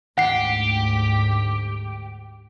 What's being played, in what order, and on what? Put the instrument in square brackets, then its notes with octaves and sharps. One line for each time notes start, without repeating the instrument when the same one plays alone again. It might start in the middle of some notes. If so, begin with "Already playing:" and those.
[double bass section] D2 G#2 [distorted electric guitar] G4 [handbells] F#5 C7